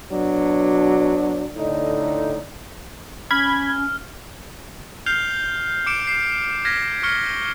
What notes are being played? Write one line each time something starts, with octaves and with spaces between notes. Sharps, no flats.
B2 F#3 D4
A2 D3 D#4
C#4 B5 F6 G#6
F6 G6 C7 F7 G7
D6 C#7 D7 E7
C7
F6 G#6 A#6 B6 D#7
C#6 F6 C#7 G7